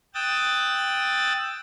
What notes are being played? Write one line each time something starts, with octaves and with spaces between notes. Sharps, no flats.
G5 D#6 E6 F#6 A6